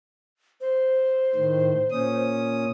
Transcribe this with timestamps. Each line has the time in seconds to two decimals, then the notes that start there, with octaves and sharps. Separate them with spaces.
0.61 C5
1.35 A2 D#3
1.91 A#2 C#4 D#6